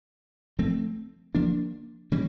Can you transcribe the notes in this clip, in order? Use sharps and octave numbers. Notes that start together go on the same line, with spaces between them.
F3 A3 C4
F3 A#3 D4
D#3 G3 A#3 C#4